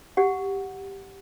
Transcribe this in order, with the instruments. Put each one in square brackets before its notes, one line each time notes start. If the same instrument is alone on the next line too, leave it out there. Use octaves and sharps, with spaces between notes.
[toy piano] G4 F#5